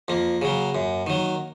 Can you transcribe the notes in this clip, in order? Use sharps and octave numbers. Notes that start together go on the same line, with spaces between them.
F2 A#3
C#3 F#3
F#2
D#3 F#3